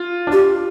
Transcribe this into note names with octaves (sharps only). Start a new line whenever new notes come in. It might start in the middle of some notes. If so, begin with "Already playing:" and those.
Already playing: F4
D4
F4 G4